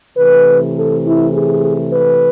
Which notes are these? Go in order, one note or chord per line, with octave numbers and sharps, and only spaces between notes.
C3 E3 A3 B4
A4
E4
G#4
B4